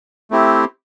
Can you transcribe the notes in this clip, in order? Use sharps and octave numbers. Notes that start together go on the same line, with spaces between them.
A3 C4 E4 G4